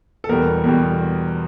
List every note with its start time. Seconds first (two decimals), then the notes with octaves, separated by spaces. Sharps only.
0.24 A4
0.29 E2 B2 G3 A#4
0.64 E2 B2 G3